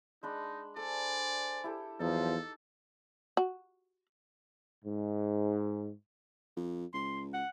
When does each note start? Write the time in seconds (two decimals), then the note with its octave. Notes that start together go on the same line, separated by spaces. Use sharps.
0.23 G#3 D4 D#4 B5
0.76 D4 A4 C5 D5 G#5
1.64 E4 G4 A4
2.00 E2 F3 F#3 D#4 A4
3.37 F#4
4.85 G#2
6.57 F2
6.94 C#2 C6
7.34 F#5